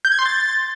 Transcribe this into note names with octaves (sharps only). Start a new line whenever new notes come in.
G6
G#6
C6
A6